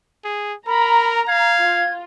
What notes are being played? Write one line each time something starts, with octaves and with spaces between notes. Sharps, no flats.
G#4
A#4 A#5 B5
F5 G#6
F4